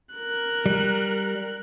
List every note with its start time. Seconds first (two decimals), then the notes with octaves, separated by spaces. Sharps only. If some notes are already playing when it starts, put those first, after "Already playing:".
0.15 A#4 F#6
0.66 G3